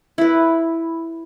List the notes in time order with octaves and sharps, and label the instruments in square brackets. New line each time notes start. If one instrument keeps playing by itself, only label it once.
[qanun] E4 B4